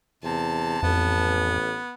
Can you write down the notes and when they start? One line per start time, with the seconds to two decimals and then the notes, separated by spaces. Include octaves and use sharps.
0.23 E2 C3 A5
0.83 A1 F2 B3